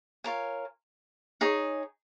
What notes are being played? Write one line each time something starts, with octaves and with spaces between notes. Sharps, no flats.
F4 A#4 C#5 G#5
D#4 G#4 C#5